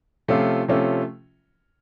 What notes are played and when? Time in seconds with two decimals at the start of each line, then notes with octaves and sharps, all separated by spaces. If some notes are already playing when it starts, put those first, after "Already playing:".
0.28 C3 F3 A3 C#4 F4
0.68 C3 F3 A3 C#4 F4